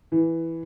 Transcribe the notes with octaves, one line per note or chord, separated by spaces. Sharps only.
E3